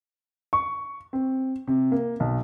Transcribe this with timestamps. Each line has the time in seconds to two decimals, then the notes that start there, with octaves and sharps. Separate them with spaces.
0.53 C#6
1.13 C4
1.67 C3
1.92 A#3
2.20 B1